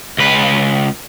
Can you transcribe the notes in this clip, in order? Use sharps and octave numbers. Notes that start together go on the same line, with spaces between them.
C#2 B4